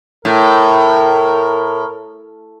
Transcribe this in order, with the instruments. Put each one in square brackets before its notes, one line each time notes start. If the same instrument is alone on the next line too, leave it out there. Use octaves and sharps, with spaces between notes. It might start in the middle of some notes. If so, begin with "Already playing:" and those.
[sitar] A2 [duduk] A#4